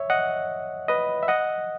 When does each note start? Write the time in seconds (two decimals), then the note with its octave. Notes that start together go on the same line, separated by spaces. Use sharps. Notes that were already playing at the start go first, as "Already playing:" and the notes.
Already playing: C#5 E5
0.10 D#5 F#5
0.88 B4 D#5
1.23 E5
1.28 D#5 F#5